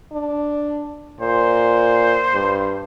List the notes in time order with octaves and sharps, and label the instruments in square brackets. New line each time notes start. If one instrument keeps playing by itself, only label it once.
[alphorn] D4
[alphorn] A#2 [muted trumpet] C5
[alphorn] G2